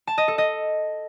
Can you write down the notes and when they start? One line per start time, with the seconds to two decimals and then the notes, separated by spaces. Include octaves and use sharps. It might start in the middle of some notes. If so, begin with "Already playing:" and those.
0.07 A5
0.18 D#5
0.28 A4
0.38 D#5